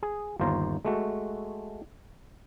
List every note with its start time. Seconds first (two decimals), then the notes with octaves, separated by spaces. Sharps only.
0.03 G#4
0.40 G1 D#2 F4 C5 A#5
0.85 G#3 A3 F#4